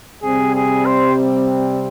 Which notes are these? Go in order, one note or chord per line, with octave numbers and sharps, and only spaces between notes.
C3 G3 C4 G#4
G#4
C5